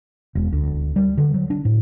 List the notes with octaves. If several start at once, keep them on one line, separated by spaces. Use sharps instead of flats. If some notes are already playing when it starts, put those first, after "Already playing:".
E1
D2
G3
D3
F#3
D4
A2